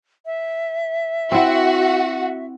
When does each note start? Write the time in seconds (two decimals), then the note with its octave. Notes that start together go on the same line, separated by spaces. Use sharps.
0.26 E5
1.32 C4 E4 F#4